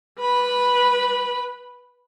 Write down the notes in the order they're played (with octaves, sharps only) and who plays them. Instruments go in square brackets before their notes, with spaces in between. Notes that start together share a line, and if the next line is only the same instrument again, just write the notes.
[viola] B4 B5